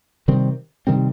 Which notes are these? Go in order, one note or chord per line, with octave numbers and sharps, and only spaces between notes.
C3 D#3 G3 C4
C3 D#3 G3 C4